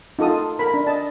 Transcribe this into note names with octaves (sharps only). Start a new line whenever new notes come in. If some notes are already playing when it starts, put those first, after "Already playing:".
D#4 F4 A4 D#6
A#4 B5
D4
D#5 A5